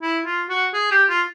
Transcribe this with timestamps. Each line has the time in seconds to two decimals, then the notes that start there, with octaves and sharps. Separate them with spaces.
0.02 E4
0.26 F4
0.49 F#4
0.74 G#4
0.91 G4
1.09 F4